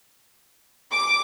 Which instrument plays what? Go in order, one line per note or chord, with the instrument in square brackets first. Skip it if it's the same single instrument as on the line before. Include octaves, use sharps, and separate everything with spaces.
[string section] D6